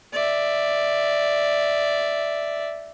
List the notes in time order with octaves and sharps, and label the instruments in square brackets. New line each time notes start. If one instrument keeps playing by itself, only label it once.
[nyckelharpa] D5 E5